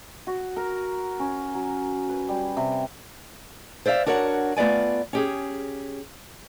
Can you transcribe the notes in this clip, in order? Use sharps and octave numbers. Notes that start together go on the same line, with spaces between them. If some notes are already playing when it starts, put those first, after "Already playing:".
F#4
A#4
C#4
F#3
B4
G3
C3
C5 D5 E5 F5
D4 F#4 A#4 C#5 F#5
A3 B3 F4 D5 G#5
C#4 G4 G#4